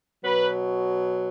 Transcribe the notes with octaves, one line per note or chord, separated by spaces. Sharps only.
B2 F#3 B4